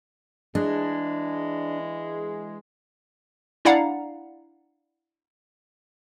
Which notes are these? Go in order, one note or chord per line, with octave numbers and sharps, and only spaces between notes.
E3 G#3 D4
D4 E4 D5 F5 F#5 A#5